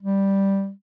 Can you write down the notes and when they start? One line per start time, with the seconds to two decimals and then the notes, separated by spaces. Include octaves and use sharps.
0.02 G3